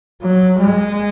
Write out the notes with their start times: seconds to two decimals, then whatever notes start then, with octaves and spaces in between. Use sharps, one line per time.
0.22 F#3
0.60 G#3